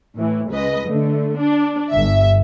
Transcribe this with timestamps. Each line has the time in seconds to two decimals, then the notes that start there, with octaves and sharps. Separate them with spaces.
0.16 A2 E3
0.50 C#2 G#3 B4 D#5
0.87 D3 A3
1.38 D4
1.91 G1 E5